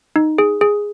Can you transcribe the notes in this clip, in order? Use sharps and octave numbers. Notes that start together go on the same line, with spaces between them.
D#4
G#4
G#4